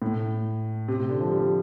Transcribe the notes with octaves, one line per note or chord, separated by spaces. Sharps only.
A2
C3
C3
D3
F3
G3